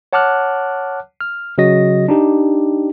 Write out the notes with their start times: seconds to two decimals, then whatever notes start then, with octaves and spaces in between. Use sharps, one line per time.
0.13 C#5 F#5 A5 D6 F6 F#6
1.20 F6
1.58 C#3 F#3 F#4 D#5 A#6
2.08 D4 D#4 G4